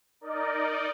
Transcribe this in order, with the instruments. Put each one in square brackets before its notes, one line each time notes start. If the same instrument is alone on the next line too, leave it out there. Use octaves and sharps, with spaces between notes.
[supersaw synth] D#4 A#4 D5 D#5